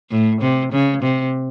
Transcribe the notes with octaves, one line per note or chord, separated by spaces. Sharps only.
A2
C3
C#3
C3